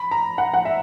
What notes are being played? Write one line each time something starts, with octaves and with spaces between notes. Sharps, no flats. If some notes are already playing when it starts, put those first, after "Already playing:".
Already playing: B5
A#5
F#5
F#5
E5